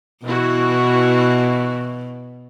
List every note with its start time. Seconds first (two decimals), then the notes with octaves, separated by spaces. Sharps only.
0.24 B2 E3 E4 F#4